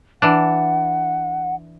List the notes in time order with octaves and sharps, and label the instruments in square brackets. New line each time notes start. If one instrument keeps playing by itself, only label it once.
[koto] E3 D4 [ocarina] F#5